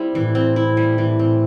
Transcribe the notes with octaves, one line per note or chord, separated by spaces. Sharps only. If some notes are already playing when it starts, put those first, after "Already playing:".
Already playing: G3 C4 E4
A2 E3
C4
E4
G3
E3
C4